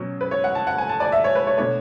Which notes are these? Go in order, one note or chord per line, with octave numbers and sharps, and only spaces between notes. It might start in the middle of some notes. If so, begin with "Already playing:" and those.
Already playing: B2 F#3 C#4
B4
C#5
F#5
A5
F#5
G#5
A5
D5
E5
C#5
B4
C#5
B2 A3 D4 C#5